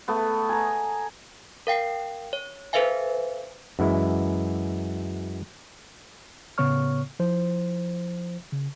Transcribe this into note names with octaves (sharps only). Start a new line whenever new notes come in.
A3 B3
G#5 A#5
A#4 F5 G5 C7
C#5
A4 B4 C5 E5 F5 G#5
F#2 E3 G#3 E4
A2 C#3 B3 C#5 C#6 F6
F3 E4 C5
C#3